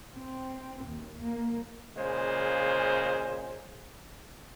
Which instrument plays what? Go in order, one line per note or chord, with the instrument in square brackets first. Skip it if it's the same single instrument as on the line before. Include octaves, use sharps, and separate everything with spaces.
[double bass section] C4
D#2
A#3
[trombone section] A#2 C#3 G#3 C5